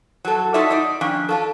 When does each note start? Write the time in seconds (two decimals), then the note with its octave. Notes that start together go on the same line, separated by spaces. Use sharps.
0.25 F#3 A4
0.54 D#4 F4 A4 C#5 D5 E5
0.70 D#4 D5
1.01 D#3 F3 C#4 D4
1.29 D4 F4 A4